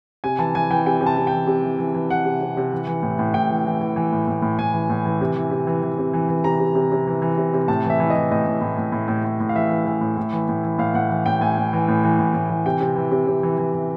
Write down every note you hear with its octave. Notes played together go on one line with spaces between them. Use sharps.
C3 G#5
E3 A5
E3 G#5
E3 G5
C3 G5
C3
A5
C3
G5
E3
C3
E3
E3
E3
E3 F#5
C3
C3
C3
E3
E3
A2
A2
A2 G5
E3
E3
E3
E3
A2
A2
A2
A2 G#5
E3
A2
E3
C3
E3
C3
E3
E3
C3
E3
E3
C3 A#5
C3
C3
C3
E3
E3
C3
C3
A2 A5
E3 E5
E3
D#5
E3
A2 D#5
A2
A2
A2
A2
A2
A2
A2
F5
E3 E5
E3
E3
A2
A2
E3
A2
E3
A2 F5
A2 F#5
E3
A2 G5
A2 G#5
A2
E3
A2
E3
A2
A2
E3
C3 G5
C3
E3
C3
C3
E3
E3
E3